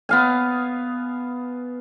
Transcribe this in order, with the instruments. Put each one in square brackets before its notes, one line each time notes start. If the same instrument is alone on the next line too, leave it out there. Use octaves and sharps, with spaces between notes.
[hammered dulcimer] B3 F5 G#5